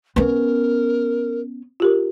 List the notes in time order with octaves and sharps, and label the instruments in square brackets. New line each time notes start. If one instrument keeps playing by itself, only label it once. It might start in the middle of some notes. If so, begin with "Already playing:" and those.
[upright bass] B3 C#4 [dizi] A#4 [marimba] B4
[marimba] F4 G4 A#4